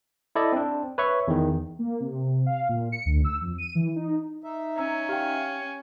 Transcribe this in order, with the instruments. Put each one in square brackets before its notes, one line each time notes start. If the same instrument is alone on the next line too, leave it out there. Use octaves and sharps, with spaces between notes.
[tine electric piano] E4 A4 D5 D#5
C4 D4
B4 C#5 E5 C#6
E2 D#3
[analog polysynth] A#3
C3
F5
A#2
C#7
D2
E6
F2
D#7
E3
D#4
[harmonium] D#4 E5
[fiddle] C#4 [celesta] A#5 E6
[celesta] G4 G5 [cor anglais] F5